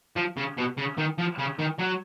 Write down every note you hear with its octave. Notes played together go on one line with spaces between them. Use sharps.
F3
C#3
B2
C#3
D#3
F3
C#3
D#3
F#3